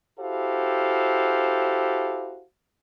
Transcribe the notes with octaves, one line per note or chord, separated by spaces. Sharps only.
E4 F#4 G4 A4 C5 F5